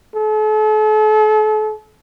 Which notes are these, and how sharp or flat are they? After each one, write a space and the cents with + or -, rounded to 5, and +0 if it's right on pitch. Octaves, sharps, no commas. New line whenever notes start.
A4 -40